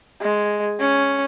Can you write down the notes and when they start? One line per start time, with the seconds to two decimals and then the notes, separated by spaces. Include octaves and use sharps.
0.21 G#3
0.80 C#4